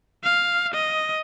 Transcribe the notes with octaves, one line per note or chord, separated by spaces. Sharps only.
F5
D#5